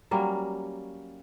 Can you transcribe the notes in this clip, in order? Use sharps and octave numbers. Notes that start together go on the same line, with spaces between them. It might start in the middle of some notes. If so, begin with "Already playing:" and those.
F#3 G3 A#3 C#4